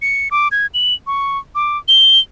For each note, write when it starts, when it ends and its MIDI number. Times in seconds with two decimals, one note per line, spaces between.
0.02 0.29 97
0.31 0.48 86
0.52 0.67 92
0.74 0.94 102
1.07 1.38 85
1.55 1.77 86
1.88 2.19 103